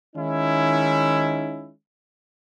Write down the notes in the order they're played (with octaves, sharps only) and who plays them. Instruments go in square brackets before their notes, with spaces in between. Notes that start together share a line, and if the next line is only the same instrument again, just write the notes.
[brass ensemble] D#3 G#3 C#4 D#4 E4